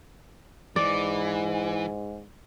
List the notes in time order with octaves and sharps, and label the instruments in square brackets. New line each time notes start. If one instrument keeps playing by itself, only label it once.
[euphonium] G#2 [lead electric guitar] E3 [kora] D5